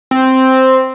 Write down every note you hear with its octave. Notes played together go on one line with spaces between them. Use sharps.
C4